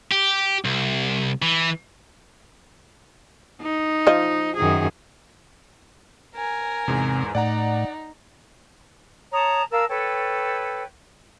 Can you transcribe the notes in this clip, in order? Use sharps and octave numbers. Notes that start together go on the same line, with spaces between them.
G4
C2
E3
D#4
F3 D#5
F#2 D#3 G#4
A#4 G#5
E2 G#2 C3
A2 D#4 D5 F#5 A#5
C#5 A5 A#5 D#6
A#4 F5 A5 E6
A4 B4 C#5 G5